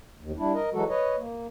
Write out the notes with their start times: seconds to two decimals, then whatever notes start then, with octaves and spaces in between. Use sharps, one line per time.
0.20 D#2
0.38 G3 D4 E4
0.54 A#4 D#5
0.73 E3 F#3 G#3 F#4 A4
0.89 B4 C#5 D#5
1.18 A#3